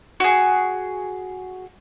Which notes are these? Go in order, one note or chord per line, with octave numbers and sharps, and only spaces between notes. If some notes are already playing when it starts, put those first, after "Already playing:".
F#4 G#4